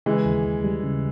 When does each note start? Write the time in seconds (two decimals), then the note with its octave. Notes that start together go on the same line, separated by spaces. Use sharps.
0.06 C#3 E3 G#3
0.25 D#2
0.45 D#2
0.64 G3
0.83 C#3